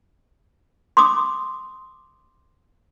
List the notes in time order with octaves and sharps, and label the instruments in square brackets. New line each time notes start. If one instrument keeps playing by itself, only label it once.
[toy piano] C6 D6 D#6